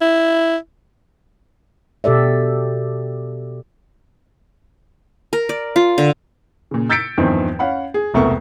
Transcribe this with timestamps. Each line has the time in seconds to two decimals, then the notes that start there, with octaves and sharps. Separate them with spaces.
0.01 E4
2.04 B2 G4 A4 D5 E5
5.33 A#4
5.49 D5
5.76 F4
5.98 D3
6.71 A#2 C#3
6.90 E6 G6 A6 B6 C#7 D7
7.17 E2 G2 D#3 F3 C4
7.59 C#4 F5 F#5 B5
7.94 G#4
8.14 E1 C2 A3 B3 A#4 C#6